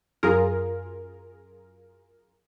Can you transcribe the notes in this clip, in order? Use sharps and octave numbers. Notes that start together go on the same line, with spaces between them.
F#2 F4 G#4 A#4